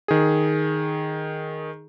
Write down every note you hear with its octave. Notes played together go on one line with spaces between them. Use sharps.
D#3 G#4